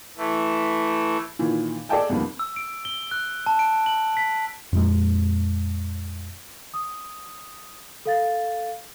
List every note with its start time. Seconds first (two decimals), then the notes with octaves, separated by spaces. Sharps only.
0.18 E3 A3
1.39 A#2 D#3 E3
1.89 G#4 A4 D5 D#5 G5 A5
2.09 C2 F2 D#3 A#3 B3
2.39 E6
2.56 D7
2.85 G7
3.11 F#6
3.46 A5
3.59 D7
3.86 F#7
4.17 B6
4.73 F2 A#2 G#3
6.74 D#6
8.06 A4 F5 A6